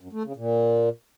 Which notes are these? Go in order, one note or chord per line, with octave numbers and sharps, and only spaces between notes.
F#2
A3
C#3
A#2